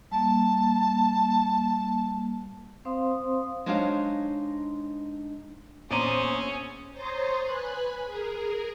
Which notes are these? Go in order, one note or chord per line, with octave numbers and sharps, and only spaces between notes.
G3 A#3 A5
C4 C5 F5 C6 D#6
G#3 D4 D#4 C5 C#5 F5
A#1 E2 C#4 C5 D5 A#5 D#6 D#7
C5 C#5 A#5 C6 D#6 A6
B4 G#5 B5 F#6
G#4 A#4